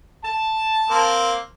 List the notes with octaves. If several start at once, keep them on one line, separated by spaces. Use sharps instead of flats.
A5
A#3 C4